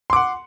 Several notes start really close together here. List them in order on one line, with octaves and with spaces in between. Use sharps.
C6 D6 F#5